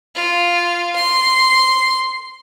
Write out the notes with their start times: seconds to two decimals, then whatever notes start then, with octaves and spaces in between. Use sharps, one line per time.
0.16 F4
0.96 C6